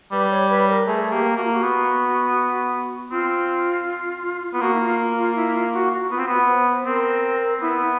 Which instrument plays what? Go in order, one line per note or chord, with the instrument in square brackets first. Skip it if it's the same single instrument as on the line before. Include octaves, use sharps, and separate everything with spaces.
[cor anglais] G3 [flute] B4
[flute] C#5
B4
A#4
[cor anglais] A3 [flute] G#4
[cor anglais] A#3 [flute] G4
[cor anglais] A#3 [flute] F#4
[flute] F4
F#4
[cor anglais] B3
[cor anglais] C4 [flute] F4
[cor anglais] B3 [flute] F4
[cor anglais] A#3 [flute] F#4
[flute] E4
F4
F4
E4
F4
F#4
F#4
[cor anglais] B3 [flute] F4
[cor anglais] C4
[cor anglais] B3 [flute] F#4
[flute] B4
C5
C5
[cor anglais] C4 [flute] A#4
[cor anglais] B3 [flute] E4